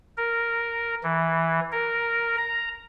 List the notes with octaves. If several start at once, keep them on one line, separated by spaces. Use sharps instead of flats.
A#4
E3
A#4
A#5